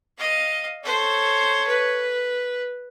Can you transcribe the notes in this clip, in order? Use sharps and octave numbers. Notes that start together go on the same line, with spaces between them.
D#5 F5
A4 C5 C#5
B4